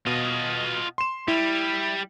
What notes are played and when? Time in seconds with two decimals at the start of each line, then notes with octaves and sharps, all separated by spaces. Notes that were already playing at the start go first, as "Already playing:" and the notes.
0.07 B2 F4 D#5
0.98 C6 E7
1.28 G3 E4